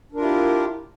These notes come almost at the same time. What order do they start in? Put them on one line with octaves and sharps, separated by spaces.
D4 A#4 F4 E4 G4